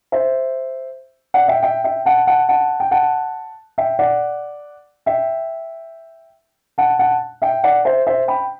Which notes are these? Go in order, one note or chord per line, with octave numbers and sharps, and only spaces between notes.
C5 E5
D5 F#5
E5 G5
E5 G5
E5 G5
F#5 A5
F#5 A5
F#5 A5
G5
F#5 A5
E5 G5
D5 F#5
E5 G5
F#5 A5
F#5 A5
E5 G5
D5 F#5
C5 E5
C5 E5
G5 B5